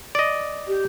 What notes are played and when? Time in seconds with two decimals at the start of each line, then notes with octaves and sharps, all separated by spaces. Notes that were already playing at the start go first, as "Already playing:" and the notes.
0.15 D5 D#5
0.67 G4